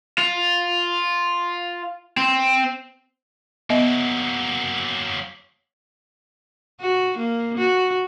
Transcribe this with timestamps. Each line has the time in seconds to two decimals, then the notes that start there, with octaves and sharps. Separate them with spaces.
0.18 F4
2.17 C4
3.70 F#3 A#3 B3 D#5 E5
6.80 F#4
7.17 A#3
7.57 F#4